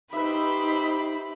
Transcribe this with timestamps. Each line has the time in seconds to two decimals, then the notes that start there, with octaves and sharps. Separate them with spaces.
0.13 D#4 G4 B4 C5 E5 B5